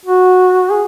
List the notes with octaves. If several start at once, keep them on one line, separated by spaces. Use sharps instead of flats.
F#4
G#4